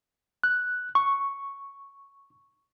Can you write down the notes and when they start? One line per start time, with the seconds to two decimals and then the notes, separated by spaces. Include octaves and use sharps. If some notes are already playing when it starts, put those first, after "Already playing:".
0.43 F#6
0.95 C#6